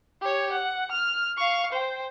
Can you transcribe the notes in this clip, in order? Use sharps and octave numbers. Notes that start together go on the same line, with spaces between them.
G4 C#5
F#5
F6
F5 C#6
C5 G5